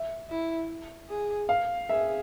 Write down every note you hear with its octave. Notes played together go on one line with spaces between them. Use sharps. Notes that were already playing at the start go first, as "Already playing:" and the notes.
Already playing: E5
E4
G#4
F5
G#4 E5